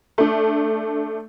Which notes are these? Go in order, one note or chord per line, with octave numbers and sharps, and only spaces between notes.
A3 D4